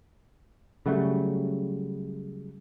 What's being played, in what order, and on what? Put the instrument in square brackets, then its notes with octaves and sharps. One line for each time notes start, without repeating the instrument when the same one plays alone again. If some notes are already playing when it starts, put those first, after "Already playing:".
[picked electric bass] C#3 F#3 G3 A3